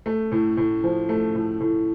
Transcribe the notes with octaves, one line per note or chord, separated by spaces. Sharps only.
A3
A2
A2
F3
A3
A2
A2